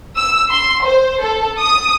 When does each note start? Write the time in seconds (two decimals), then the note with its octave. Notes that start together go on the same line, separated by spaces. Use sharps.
0.17 E6
0.50 C6
0.85 C5
1.22 A4
1.59 D#6